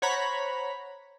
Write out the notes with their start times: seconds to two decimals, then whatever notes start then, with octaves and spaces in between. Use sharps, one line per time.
0.02 C5 C#5 F#5 A#5 B5